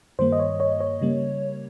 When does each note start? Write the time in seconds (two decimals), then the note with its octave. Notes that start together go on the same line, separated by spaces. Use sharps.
0.19 G2 D#3 G3 A#3 C5
0.32 D#5
0.39 C#5
0.60 C#5
0.80 C#5
1.01 C#3 G3 A#3